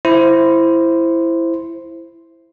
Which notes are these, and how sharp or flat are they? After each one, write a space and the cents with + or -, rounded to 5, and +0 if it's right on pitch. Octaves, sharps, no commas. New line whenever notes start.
E4 +10 C5 +0